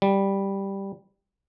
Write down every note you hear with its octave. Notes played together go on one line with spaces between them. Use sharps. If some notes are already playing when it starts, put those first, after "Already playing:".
G3